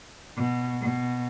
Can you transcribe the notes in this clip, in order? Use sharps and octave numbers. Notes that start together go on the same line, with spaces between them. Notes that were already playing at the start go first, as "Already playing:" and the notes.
B2
B2